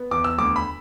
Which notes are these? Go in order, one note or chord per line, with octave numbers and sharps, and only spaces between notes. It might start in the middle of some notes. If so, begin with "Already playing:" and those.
Already playing: B3
E2 D6
E6
D2 D6
B5